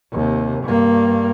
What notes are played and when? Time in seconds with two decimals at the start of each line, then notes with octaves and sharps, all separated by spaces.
0.12 D#2 C3
0.64 G2 A#3